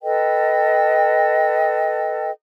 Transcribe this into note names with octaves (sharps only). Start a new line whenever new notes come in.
A4 B4 D#5 G5